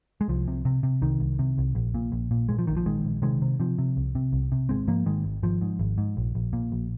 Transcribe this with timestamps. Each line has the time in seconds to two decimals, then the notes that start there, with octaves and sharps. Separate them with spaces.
0.21 G#3
0.28 C2 F3
0.48 C3
0.65 C3
0.83 C3
1.02 C2 D#3
1.20 C2
1.39 C3
1.58 C2
1.75 A#1
1.94 A#2
2.12 A#1
2.31 A#2
2.49 A#2 G#3
2.59 F3
2.67 A#1 D#3
2.77 F3
2.85 A#1 D#3 G#3
3.05 A#1
3.22 C3 D#3 G#3
3.42 C3
3.60 C3 F3
3.78 C3
3.97 C2
4.15 C3
4.33 C2
4.52 C3
4.69 G#1 G#3 C4
4.87 G#2 F3 A#3
5.06 G#2 D#3 G#3
5.24 G#1
5.43 G#1 F3
5.61 G#2
5.79 G#1
5.98 G#2
6.17 A#1
6.35 A#1
6.53 A#2
6.72 A#1